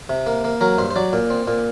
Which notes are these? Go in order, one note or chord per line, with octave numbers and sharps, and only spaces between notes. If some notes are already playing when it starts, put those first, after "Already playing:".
C3
A#3
A#3
F#3 A#4
G2 C5
C5
F#3 D5
A#2
C4
A#2